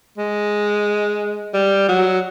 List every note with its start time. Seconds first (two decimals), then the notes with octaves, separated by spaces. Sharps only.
0.18 G#3
1.54 G3
1.88 F#3